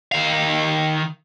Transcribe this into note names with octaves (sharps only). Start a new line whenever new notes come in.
D#3 F5